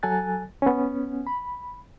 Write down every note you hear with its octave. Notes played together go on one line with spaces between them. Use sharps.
F#3 A4 G#5 F#6 A6
B3 C#4
B5